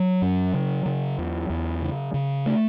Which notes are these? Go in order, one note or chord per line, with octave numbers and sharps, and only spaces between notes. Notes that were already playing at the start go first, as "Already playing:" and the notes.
Already playing: F#3
F#2
C#3
C#3
E2
E2
C#3
C#3
A3